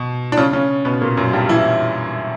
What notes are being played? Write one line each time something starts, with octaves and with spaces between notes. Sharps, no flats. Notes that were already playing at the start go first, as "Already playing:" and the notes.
Already playing: B2
D4
C#3 C#4
C#3 C#4
B2 B3
A#2 A#3
F#2 F#3
G2 G3
E3 E4